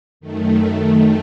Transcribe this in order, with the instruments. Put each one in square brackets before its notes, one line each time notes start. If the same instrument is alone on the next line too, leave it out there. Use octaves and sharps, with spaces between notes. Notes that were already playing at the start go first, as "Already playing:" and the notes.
[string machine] F#2 D#3 A3